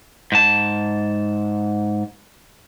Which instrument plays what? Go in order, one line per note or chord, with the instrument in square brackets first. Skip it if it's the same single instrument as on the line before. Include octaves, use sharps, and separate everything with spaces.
[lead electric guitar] G#2 A5